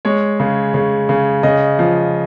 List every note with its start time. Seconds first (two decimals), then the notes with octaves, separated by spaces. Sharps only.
0.05 G#3 C#5
0.40 C#3
0.74 C#3
1.09 C#3
1.43 C#3 D#5
1.79 F3